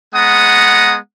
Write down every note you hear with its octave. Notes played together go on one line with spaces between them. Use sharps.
G#3 B3 F#5 A#5 D#6